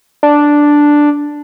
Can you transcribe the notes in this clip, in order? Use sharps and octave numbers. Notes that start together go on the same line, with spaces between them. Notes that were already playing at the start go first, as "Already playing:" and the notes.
D4